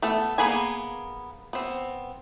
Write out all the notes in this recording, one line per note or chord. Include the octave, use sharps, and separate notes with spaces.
A3 B3 A4
A#3 B3 G#4 B4 G#5
B3 C4